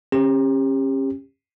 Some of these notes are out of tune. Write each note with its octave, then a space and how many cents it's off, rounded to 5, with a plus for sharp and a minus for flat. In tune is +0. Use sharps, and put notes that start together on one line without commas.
C#4 -35 G4 +25